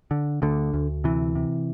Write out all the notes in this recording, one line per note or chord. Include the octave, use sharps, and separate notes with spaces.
D3
D2 D3
D2
C3 E3
C3